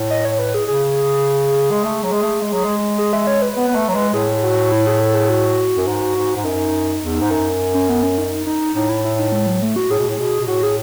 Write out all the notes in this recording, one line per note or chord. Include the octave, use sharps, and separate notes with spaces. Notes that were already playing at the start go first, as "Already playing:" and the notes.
Already playing: A2
D#5
C#5
B4
G#4
C#3 G#4
G#3
A3
F#3
G#3
A3
G#3
F#3
G#3
G#4
E5
C#5
B4
B3
B3
A3
F#3
G#3
A2 G#4
F#4
E4
G#4
A4
G#4
F#4
F#2
G#2
G#2
G#2
F#2 D#4
E2
G#2
F#2
C#4
B3
C#4
D#4
D#4
A2 D#4
E4
E4
D#4
G#3
F#3
A3
F#4
A2 G#4
B2
A2
B2
B2
A2 F#4
G#4